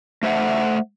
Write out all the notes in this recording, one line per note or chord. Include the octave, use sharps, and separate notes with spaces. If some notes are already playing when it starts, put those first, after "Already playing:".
A3 C5 E5 F#5